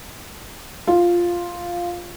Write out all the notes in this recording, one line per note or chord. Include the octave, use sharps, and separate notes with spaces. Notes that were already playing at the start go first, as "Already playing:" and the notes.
F4